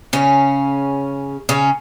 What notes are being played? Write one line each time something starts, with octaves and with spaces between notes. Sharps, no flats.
C#3 C#4
C#3 C#4